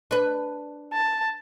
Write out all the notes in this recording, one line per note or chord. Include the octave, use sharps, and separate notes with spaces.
D4 B4
A5